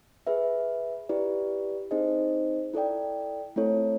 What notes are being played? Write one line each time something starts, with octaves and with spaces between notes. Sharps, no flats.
G#4 B4 E5
E4 G4 B4 D5
C4 D#4 G#4 C5 D#5
E4 A4 D5 G5
A3 C4 E4 A4 C#5